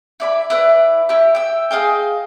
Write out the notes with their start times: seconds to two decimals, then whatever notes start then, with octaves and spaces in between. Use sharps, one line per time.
0.20 E4 D5 B5
0.50 E4 B4 D5
1.09 E4 G4
1.35 G5 E6
1.71 G#4 D#5 F5 G5